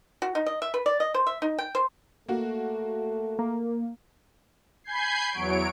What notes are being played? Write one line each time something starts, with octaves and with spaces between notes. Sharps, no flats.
F#4
D#4
D#5
E5
B4
D5
D#5
C5
E5
D#4
G5
C5
A3 A#3 F#4
A#3
G#5 B5 G6 G#6 C7
E2 F#3 C#5 D7